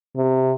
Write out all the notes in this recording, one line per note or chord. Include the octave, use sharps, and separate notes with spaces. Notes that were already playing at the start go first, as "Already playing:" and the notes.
C3